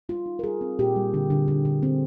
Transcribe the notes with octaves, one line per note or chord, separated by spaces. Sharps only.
G3 F4
D#4
A#4
G3 G#4
C4
A#2 G4
G3
D3
D3
D3
D3
C4